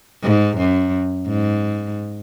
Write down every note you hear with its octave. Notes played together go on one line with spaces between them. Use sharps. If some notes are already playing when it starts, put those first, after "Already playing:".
G#2
F#2
G#2